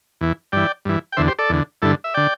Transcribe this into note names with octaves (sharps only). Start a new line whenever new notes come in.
E2 E3
G2 E3 D5 G5
G2 E3
G5
E2 D3 C5 E5
G4 C5
A4 D5
E2 D3
G2 D3 E4 A4
E5
D3 D5 G5